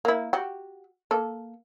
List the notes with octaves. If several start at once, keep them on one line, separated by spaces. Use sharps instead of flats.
A#3 E4
F#4 G4
A#3 A4